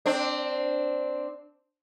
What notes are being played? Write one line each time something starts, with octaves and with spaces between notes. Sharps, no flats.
C4 D4